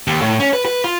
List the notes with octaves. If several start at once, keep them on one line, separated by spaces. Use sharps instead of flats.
D#2
A2
C#4
B4
B4
F4